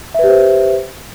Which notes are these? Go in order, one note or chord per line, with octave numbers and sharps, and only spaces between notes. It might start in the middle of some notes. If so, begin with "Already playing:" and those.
G4 B4 C5 E5